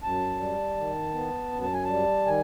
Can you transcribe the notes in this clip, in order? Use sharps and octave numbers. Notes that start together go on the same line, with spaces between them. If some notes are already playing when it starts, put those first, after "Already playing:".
F#2 A5
G3
D#3
B3
F#2
A5
G#5
G3 A5
D#3 G#5